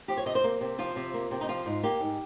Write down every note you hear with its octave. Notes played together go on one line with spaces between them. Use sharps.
F3 G4
C#5
C3 D#5
C5
A#3
C3
F3 F4
C3
A#3
C3
D#4
F3 F4
G#2
A#3 G4
G#2